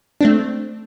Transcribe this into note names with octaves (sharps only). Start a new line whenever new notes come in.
A3 C4 D4